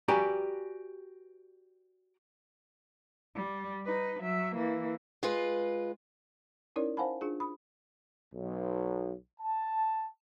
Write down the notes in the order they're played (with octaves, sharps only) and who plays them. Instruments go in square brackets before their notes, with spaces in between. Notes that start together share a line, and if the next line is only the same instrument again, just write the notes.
[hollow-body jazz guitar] F#4 G4 B4 D5 G#5 A#5
[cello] G3
D#4 B4
F#3 E5
E3 A#3
[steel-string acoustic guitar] G#3 F4 B4
[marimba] C#4 D#4 E4 A#4 C#5 D5
C5 F5 F#5 G#5 A5 B5
D4 F4 G#4
B5 D#6
[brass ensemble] B1
A5